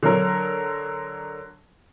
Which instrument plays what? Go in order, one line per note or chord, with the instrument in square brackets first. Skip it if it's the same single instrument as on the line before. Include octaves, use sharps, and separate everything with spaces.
[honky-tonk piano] D3 F#3 A#4